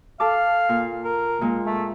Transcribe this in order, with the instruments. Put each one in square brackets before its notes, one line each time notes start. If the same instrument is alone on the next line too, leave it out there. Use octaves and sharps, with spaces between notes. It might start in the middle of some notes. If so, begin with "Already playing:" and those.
[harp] A4 A5 D6 [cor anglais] F5
[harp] A#2
[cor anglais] A#4
[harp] A#2 G#3
[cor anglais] A3